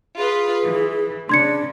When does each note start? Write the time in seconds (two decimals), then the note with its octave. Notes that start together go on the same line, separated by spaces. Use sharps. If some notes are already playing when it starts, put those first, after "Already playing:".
0.18 F4 G#4 B4
0.65 E3
1.29 C#3 D4 C6 G#6 C#7